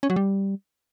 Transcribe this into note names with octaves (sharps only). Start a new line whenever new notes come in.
C#4
F#3
G3